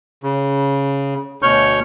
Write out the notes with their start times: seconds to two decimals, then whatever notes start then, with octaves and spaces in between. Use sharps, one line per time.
0.23 C#3
1.42 D2 B2 C#5 C#6 F6 G6